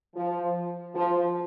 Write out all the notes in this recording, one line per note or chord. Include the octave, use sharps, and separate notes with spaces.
F3
F3